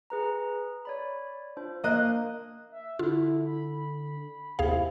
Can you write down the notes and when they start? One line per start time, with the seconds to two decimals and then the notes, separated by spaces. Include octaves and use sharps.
0.10 G#4 B4 A#5
0.85 C#5 D5 B5
1.57 D4 F4 C5
1.84 A#3 D#5 F#6
2.71 E5
2.99 D3 E4 F4
3.46 B5
4.59 D#2 C3 C4 E4 G#4 F5